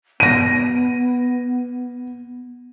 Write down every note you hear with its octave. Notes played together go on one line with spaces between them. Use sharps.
B3 A#6 D#7